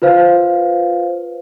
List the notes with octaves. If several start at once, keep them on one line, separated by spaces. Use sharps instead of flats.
F4 B4 C5 F5